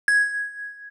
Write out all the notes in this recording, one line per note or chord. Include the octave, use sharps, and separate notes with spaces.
G#6